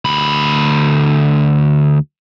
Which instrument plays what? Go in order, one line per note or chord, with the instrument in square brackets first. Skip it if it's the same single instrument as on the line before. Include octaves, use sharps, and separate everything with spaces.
[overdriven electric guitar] D2 B5